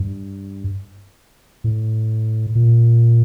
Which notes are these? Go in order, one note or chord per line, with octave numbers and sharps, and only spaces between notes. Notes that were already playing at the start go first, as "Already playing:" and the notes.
Already playing: G2
A2
A#2